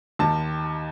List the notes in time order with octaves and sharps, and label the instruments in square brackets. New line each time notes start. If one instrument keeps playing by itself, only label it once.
[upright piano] D#2 D#3 A5